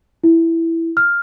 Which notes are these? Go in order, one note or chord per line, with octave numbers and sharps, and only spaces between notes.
E4
F6